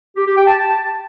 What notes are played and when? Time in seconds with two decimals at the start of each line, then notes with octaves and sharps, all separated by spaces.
0.16 G4
0.26 G4
0.37 G5
0.47 A5